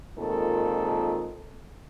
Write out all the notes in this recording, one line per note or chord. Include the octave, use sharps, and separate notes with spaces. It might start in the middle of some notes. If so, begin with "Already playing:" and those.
A#2 D#3 G#3 C4 F4 A4